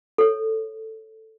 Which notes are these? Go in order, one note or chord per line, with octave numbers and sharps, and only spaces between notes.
A4 C#5